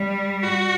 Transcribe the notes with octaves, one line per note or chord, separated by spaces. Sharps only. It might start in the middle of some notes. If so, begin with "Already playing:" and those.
Already playing: G3
F#4